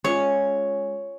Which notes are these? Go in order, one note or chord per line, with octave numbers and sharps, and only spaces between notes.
G#3 C#4 F4 C#5